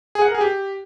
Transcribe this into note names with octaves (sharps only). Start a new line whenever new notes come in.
G#4
F#5
A#4
G#4
G4